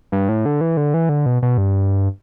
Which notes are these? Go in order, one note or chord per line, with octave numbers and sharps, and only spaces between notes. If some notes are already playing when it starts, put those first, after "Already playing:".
G2
A2
D3
E3
D3
E3
D3
B2
B2
G2